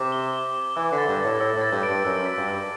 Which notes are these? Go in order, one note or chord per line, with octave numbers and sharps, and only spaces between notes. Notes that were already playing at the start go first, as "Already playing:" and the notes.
Already playing: C3 D6
G7
G7
G7
E3 E6
D3
A6
G2
A2 A6
A2 E6
A2 A6
G2
D7
G2
F#2 E6
B6
G2
E6